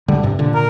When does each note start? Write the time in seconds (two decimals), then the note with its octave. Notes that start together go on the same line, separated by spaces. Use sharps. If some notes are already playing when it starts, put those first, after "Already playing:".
0.08 D3 G3
0.23 G2 C3
0.39 A#2 D3
0.55 A#4